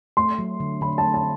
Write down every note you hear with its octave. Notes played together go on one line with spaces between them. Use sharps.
A3 C6
F#3
D3
D3 B5
A5
A3
A5